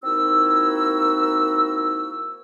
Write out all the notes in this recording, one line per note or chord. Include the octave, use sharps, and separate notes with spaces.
A#3 C4 D#4 E4 F#4 E6